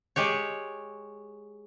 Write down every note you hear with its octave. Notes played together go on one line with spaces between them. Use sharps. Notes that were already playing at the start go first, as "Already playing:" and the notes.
G#3 G4 C#5